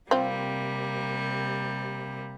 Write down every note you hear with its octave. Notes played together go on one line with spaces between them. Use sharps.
C3 G3 A#3 C4 F4